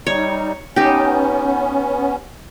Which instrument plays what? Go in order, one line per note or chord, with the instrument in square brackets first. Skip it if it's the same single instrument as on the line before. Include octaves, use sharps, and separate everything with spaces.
[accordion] G3 D#4 [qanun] C#5
[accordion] B3 C#4 [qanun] D#4 G4